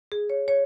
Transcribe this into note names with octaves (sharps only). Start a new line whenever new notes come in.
G#4
C#5
C#5